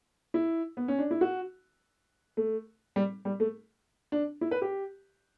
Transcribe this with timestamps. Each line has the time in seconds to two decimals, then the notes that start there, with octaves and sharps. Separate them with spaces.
0.34 E4
0.77 B3
0.88 C#4
0.99 D4
1.11 E4
1.21 F#4
2.37 A3
2.96 G3
3.25 G3
3.40 A3
4.12 D4
4.41 E4
4.51 B4
4.62 G4